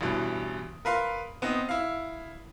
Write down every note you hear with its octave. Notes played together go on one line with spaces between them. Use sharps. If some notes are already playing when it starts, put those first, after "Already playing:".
A1 G2 B2 E3
A#4 B4 F5 C6
B3 C4 D#4
E4 F5